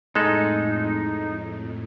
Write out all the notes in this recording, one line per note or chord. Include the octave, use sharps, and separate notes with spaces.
F2 A2 G#3 D#4 A4